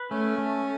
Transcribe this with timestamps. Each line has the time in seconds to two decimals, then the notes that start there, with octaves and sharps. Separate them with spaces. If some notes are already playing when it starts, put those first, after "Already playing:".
Already playing: B4
0.11 A3 C#4
0.38 A3